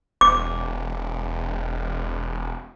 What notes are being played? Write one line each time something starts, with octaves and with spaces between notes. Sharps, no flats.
E1 D6